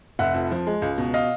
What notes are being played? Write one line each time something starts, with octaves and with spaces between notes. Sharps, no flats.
F1 E5 F#5
F2
F3
G#3
C#2
B2
D#5 F5